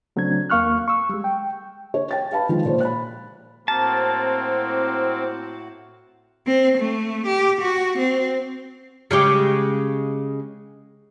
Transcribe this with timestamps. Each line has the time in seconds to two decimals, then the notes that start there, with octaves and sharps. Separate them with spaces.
0.16 C#3 F#3 A3 C4 D4 G#6
0.50 D#2 A#3 F5 C#6 F6 F#6
0.88 C#6 E6
1.09 G3 G#3
1.24 G5
1.94 C#5
2.11 G5 A6
2.32 B4 F5 A5 B5
2.49 D#3 F3 G#3 F4
2.65 A#2 C5 C#5
2.80 B5 F#6
3.68 A2 A#3 C4 F#4 A5
6.47 C4
6.78 A3
7.27 G4
7.61 F#4
7.98 C4
9.11 C#3 G#3 G4